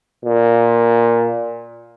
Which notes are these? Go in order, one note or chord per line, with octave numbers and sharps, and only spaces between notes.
A#2